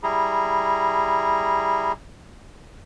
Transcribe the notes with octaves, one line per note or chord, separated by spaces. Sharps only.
G3 E4 G#4 A#5